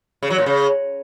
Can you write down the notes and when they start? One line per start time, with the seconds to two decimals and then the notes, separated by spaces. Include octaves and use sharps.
0.23 C#3
0.30 F#3
0.38 A#2
0.46 C#3